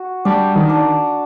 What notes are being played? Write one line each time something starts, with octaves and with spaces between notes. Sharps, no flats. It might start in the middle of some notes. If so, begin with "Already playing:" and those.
Already playing: F#4
G3 D4
D#3
D4